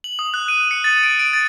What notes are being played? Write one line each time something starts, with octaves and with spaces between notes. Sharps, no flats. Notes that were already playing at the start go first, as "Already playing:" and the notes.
F#7
D#6
F#6
D#7
C#7
A6
D7
D7
A6